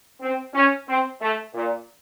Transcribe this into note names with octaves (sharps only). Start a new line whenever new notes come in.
C4
C#4
C4
A3
A#2